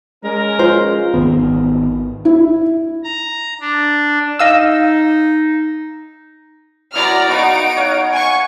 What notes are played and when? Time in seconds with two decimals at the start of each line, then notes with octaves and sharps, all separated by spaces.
0.24 G#3 C#4 A#4
0.59 F4 C5
1.14 G#1 F#2 D#3 B3
2.25 E4
3.04 A#5
3.60 D4
4.39 D#4 D#5 F5 E6
6.94 F#3 E4 D5 A#5 D#6 F6
7.27 B3 D#4 F#4 F5 D7
7.76 C#5 F5 F#5
8.12 G#5 C#6